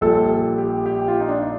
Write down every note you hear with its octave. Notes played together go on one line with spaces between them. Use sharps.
A#1 A#2 G3 A4
G4
G4
F4
D#4
D4